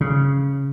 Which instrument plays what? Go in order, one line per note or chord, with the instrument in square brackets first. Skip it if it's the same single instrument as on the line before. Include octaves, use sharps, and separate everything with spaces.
[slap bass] C#3